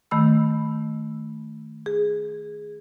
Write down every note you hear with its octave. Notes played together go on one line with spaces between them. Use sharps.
D#3 A3 B5 E6
G#4